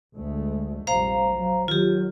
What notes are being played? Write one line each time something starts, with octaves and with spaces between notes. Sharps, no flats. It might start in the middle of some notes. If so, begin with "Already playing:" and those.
D2 G#3 A3
F1 A#1 G3 C5 F5 A#5
F#3
D#3 F#3 F4 G4